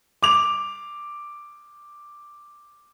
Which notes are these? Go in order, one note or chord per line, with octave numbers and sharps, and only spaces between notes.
D6 F7